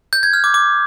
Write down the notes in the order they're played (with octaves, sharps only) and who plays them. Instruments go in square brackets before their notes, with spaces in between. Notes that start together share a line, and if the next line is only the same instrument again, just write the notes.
[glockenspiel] G6
G#6
F6
D6
D6